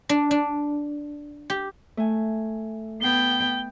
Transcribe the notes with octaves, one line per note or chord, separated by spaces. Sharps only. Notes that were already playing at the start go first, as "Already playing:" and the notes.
D4
D4
G4
A3 G#5
B3 G5 G7